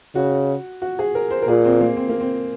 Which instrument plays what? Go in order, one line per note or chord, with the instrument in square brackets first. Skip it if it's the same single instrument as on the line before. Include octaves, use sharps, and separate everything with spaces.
[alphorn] C#3 [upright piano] F#4
[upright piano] F#4
G#4
A#4
C5
A#4
[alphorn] A#2 [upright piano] G#4
[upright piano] C4
A#3
C4
A#3
C4